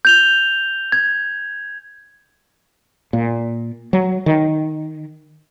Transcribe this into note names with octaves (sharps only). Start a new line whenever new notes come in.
G6 F7 G7
G#6
A#2
F#3
D#3